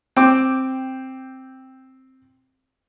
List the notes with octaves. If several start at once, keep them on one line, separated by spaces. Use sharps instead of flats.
C4 G5 D6